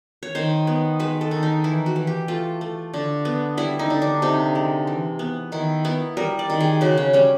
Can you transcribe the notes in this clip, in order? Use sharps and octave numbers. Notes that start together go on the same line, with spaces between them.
C#5
D#3 C5
B3
G#3 B4
A4
D#3
D#4
E3 E4
F#4
E3
G4
A3 F4
A3
D3
B3
G3 E4
D#4
D3
D4
C3 D#4
G#3
E3
B3
D#3 E4
B3 E4
G3 A#4
D5
D#3
G#4
C#3 F#4
C#4
G3 C#4